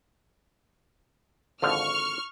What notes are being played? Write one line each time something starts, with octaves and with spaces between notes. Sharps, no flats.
G#1 D3 F3 C#6 F6